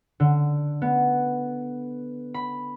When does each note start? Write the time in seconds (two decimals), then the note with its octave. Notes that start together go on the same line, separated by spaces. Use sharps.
0.20 D3
0.82 B3
2.34 B5